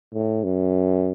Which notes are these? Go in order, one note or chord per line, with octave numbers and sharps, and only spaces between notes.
A2
F#2